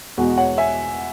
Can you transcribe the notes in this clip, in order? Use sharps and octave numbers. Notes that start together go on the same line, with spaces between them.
E2 B2 G#3 F#4
C#5 F#5
E5 G#5